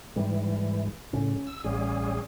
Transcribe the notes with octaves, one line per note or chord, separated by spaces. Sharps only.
G#2 E3 G3
A2 C#3 C#4
E6
A1 G3 C#4 G#4